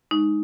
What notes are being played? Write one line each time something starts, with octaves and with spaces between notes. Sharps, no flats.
G#3 D#4